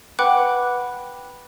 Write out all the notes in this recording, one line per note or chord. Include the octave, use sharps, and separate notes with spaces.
B4 F#5 G5 B5 D6 F#6